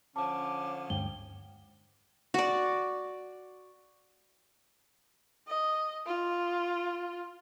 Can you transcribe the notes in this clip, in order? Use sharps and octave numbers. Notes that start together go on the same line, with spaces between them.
D3 F3 C#4 A5 D6
D2 G2 G#3 G5 G7
F#4 D5
D#5
F4